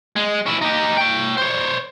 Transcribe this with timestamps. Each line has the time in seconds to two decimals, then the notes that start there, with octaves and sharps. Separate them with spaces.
0.16 G#3
0.46 C#4 E4
0.61 D#4 G4
0.98 C#5 G5
1.37 C5 C#5